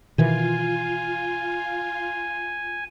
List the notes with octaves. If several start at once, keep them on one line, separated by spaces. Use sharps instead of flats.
B2 D#3 E3 F4 G#5